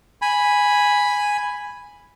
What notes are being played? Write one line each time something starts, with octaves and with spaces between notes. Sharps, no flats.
G#5 B5